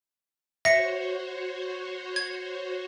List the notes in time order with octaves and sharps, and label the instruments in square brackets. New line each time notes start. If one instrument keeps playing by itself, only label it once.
[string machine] F#4 C5 C#5 [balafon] E5 [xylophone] A#6 C#7
[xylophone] G#6